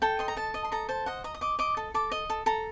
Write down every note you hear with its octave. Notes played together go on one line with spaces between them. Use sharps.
A4 G5
D#5 C6
A#5
A4 A5
D#5
C6
A4 A#5
C5 A5
D#5 F#5
D#5 A#5
D#6
D#5 D6
D#5 D6
A4
A4 D6
D#5
A4
A4 A#5